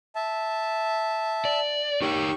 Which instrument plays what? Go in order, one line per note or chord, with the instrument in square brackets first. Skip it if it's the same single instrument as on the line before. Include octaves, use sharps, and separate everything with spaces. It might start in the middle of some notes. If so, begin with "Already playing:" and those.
[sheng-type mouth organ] E5 A5
[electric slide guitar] D5
[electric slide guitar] D#4 A#4 C#5 [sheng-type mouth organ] G4 C#6